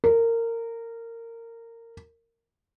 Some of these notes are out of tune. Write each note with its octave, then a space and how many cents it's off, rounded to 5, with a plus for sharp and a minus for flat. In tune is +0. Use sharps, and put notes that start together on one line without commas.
A#4 -20